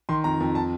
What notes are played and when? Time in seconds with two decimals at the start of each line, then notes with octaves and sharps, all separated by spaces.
0.09 D#3 C6
0.24 F2 A#5
0.40 F2
0.55 A5